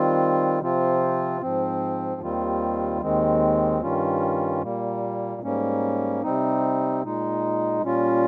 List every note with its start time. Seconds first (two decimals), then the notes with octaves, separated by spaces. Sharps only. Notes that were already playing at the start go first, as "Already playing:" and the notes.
Already playing: D#3 G3 C4 F4
0.61 C3 F3 C4 F4
1.41 G#2 F3 C4
2.21 D#2 D#3 G3 C4 F4
3.02 D#2 D#3 G#3 C4
3.81 G2 D#3 G3 C#4 F4
4.61 A#2 G3 A#3
5.42 G#2 G3 A#3 C#4
6.23 C3 G3 C4 D#4
7.03 A#2 G#3 D#4
7.83 A#2 G3 C#4 F4